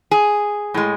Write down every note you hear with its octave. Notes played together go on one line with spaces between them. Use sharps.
G#4
A2 G#3